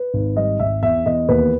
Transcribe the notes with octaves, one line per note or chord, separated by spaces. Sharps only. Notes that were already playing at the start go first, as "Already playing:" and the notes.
Already playing: B4
G#1
G3 D#5
G#1 E5
E2 E5
E2 D#5
D#2 B4